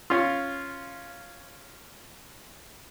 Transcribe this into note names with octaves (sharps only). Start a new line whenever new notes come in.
C#4 F4